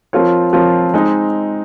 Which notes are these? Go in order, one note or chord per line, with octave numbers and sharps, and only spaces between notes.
F3 C4 F4 A#4 C#5
F3 C4 F4 A#4 C#5
G#3 C4 D#4